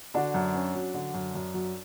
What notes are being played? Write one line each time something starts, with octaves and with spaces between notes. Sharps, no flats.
D3 D4 F#4
F#2
C#4
F#3
D3
F#2
F#2
F#3